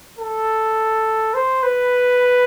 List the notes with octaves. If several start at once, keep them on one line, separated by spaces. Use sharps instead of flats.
A4
C5
B4